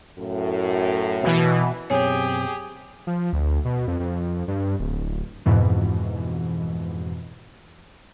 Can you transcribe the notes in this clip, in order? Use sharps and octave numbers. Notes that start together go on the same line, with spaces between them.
F#2 A2
B2 E3
F#2 B2 C4 G4 G#4 C#5 G#5
F3
D2
B2
F2
F2
G2
D1
F2 G#2 B2 E3